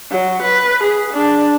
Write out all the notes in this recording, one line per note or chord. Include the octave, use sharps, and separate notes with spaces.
F#3
B4
G#4
D4